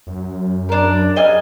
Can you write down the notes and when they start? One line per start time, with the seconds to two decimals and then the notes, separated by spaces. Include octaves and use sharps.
0.07 F#2
0.69 D4 A#4
1.16 D#5 G#5 F6